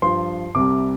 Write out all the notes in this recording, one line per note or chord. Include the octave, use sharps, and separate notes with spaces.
G2 F3 C6
C2 C3 G3 D6